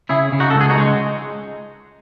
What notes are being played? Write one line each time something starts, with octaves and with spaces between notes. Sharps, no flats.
C#3 E4 G#4
C#3
D#4 F#4
A4
C#2
G#4
D#4 F#4
G#3